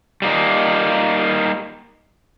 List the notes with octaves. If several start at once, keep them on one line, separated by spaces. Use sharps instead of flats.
G3 A#3 D#4